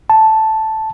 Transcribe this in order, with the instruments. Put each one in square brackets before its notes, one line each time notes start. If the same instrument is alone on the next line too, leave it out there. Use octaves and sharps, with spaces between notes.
[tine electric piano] A5